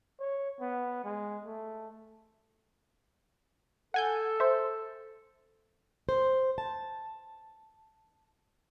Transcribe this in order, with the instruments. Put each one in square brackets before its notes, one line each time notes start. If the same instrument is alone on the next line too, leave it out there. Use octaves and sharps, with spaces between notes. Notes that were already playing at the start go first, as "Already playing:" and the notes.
[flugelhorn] C#5
B3
G#3
A3
[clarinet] A4 [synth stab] F#5 G#5 G6
[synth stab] C5 E5
[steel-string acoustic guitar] C5
A5